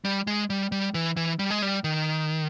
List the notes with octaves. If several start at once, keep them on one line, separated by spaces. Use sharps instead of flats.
G3
G#3
G3
G3
E3
E3
G3
G#3
G3
D#3